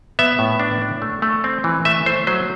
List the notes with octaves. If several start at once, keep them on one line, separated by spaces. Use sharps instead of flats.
B3 E5
A2
D4
D4
A3
A3
C4
E3
A3 E5
A3 C5
F#3 C5